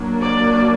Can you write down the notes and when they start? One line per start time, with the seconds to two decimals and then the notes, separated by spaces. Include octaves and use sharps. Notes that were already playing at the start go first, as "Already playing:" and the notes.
Already playing: F#3 A#3 D4
0.22 D5